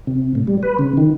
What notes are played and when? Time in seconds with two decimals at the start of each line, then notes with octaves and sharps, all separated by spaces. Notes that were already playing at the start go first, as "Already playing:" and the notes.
0.07 C3
0.35 A2
0.47 G3
0.63 B4
0.79 C#3
0.97 D#3